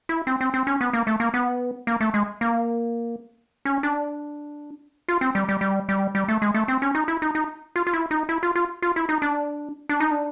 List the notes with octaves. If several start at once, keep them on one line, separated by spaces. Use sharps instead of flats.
E4
C4
C4
C4
C#4
B3
A#3
A3
A#3
B3
A#3
A3
G#3
A#3
C#4
D4
F4
C4
G3
G3
G3
G3
G3
A3
G#3
A3
C4
C#4
D#4
E4
D#4
D#4
F4
F4
E4
D#4
E4
F4
F4
F4
E4
D#4
D4
D4
D#4
D4